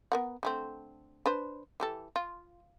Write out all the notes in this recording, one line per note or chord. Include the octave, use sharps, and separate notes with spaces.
B3 A#4 F#5
D3 A3 C4
D4 B4 C5
E3 G4 A4
F4